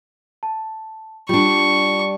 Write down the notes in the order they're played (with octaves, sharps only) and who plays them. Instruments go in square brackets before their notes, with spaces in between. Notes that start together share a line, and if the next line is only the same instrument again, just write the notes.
[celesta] A5
[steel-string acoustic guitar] G3 D4 [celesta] F4 [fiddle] C#6